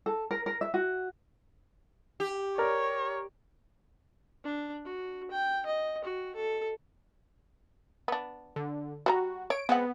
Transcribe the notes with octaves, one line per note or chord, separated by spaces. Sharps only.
A4
A#4
A#4
E5
F#4
G4
A#4 C#5 D5
D4
F#4
G5
D#5
F#4
A4
B3 D4
D3
G3 F#4 B4 A#5
C#5 D7
G#3 B3 C4 F#5